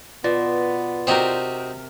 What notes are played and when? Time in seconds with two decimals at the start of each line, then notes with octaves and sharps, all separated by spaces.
0.24 B2 B3 F4 D5
1.07 C3 C4 D#4 F#4 G4 A#4